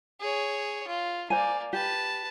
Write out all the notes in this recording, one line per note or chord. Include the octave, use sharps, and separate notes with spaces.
G#4 C#5
F4
A#3 C5 D5 G#5
G4 B4 A5